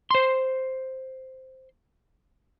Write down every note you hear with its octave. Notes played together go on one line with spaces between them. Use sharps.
C5 C6